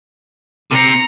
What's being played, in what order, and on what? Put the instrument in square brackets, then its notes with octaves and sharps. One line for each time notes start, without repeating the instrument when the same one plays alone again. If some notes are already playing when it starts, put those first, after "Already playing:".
[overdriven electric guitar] C3 C4 [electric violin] A#5 C#7